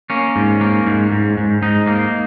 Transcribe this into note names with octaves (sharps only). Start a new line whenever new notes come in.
A#3 C#4
G#2
A#3
G#2
G#2
G#2
G#2 D#4
A#3